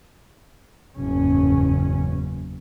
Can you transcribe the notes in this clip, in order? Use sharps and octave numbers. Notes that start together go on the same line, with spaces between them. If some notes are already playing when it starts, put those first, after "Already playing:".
F#1 E2 G#2 C#4